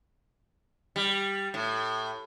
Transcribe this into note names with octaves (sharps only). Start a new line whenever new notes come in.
G3
A2